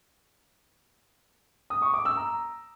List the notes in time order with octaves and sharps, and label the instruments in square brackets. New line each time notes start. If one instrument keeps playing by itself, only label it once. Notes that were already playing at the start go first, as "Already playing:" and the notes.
[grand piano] D#6
C#6
D6
E6
A#5